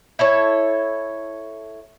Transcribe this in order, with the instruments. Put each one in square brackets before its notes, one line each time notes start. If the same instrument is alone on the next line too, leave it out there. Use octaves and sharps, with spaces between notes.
[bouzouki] E4 A4 C#5